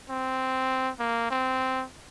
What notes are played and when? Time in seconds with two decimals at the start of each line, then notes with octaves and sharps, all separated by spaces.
0.09 C4
0.99 A#3
1.30 C4